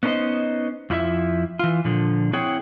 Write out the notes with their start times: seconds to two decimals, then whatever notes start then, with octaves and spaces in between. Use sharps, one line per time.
0.03 B3 C#4 D#4 A#4 C5 D#5
0.90 F2 F3 E4 F4 E5
1.59 E3 F4
1.85 A#2 D3 F3
2.33 C4 E4 G#4 C#5 F#5 G5